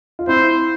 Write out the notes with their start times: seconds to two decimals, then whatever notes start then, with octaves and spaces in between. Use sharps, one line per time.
0.19 F4
0.27 C4 E4 C5